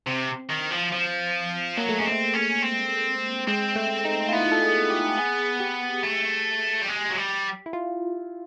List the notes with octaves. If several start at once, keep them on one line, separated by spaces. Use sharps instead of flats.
C3 C4
D#3
F3
F3
F#3 A#3
A3
G#3 C#4
C4
A3
C#4
C4
G#3 C4
A3
D#4
F4
B3 E4
A4
G#4
G4
G4
G#4
G4
A3
G3
G#3
F#3
G3
E4
F4